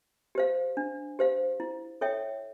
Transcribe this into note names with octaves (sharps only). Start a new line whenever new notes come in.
G4 C5 F5
D4
G4 C5 F5
E4
A4 C#5 E5 G5